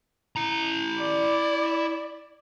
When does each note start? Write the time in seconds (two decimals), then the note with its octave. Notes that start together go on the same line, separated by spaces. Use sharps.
0.36 E4 A#5
0.99 D5